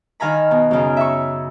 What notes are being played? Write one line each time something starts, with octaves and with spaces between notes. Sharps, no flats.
D#3 F5 G#5 A#5 B5
B2
F#2 C#3
E5 C#6